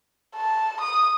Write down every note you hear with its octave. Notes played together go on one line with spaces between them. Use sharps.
A5
D#6